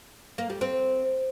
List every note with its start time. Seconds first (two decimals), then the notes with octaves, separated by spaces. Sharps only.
0.38 A#3
0.50 G3
0.61 C4